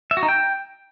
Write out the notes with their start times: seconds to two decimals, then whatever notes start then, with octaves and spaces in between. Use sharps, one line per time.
0.11 E5
0.17 F#4
0.23 D#4
0.28 G5